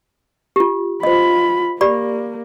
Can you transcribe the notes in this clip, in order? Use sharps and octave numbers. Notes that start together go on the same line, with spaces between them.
F4 G4
F4 C5 D#5 B5
A#3 G4 D5 B5